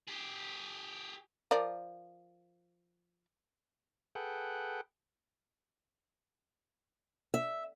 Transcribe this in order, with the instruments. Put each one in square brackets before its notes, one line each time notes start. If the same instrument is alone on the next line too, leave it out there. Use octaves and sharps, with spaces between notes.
[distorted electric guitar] G4 G#4
[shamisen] F3 A#4 D5
[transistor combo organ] G#4 A4 B4 F#5 G5
[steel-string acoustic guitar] E5